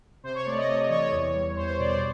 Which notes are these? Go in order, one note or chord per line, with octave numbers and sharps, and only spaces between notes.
C3 C5
C#5
A3 D5
D#5
C3
D#5
E3 C#5
C#5
E2
G3
E2 C5
C5
B2 D5
C5